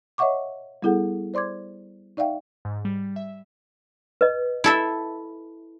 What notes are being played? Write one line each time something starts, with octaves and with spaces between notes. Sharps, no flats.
C#5 D#5 E5 F#5 C#6 D6
G3 B3 E4 G#4 A4 F#5
C5 D5 C6 D6 G#6
D#4 D5 E5 F5 G5
G#2
G3
E5
B4 D#5
E4 A4 E5